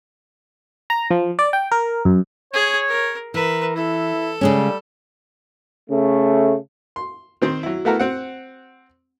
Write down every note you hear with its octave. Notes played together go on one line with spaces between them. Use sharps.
A#5
F3
D5
G5
A#4
F#2
G#4 C#5
A#4
E3 A#4 B4 E5
E4 A4
C#3 G3 G#3 C#4
C#3 A3
C6
D#3 C4 C5
F#3 E4
A3 B3 E4 F#4 A4 A#4
C4 F#5